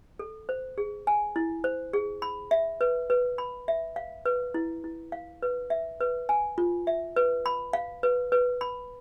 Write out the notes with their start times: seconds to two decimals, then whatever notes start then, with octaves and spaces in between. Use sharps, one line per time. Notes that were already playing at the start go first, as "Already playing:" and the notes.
0.19 A4
0.49 C5
0.78 G#4
1.07 G#5
1.36 E4
1.64 C5
1.93 G#4
2.22 B5
2.51 E5
2.81 B4
3.10 B4
3.38 B5
3.68 E5
3.96 F5
4.26 B4
4.54 E4
4.84 E4
5.12 F5
5.42 B4
5.70 E5
6.01 B4
6.29 G#5
6.58 F4
6.87 E5
7.16 B4
7.46 B5
7.73 F5
8.03 B4
8.32 B4
8.61 B5